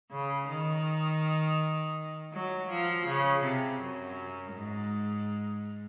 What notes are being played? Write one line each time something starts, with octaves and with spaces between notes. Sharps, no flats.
C#3
D#3
F#3
F3
C#3
C3
F#2
G#2